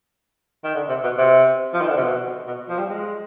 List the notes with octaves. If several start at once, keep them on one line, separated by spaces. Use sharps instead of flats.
D#3
D3
C3
B2
C3
F3
D#3
D3
C3
B2
B2
F3
G3
G#3